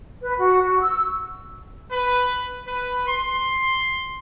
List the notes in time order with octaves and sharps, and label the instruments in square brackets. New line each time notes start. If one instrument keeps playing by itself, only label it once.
[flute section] B4
F#4
F#4
E6
[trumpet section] B4
B4
C6